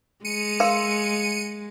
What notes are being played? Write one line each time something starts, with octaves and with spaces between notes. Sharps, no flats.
G#3 C#7 D#7
A#4 F5 C6